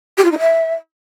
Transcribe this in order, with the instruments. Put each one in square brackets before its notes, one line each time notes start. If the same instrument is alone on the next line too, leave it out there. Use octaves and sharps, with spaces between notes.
[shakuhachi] G4
F4
D#4
E5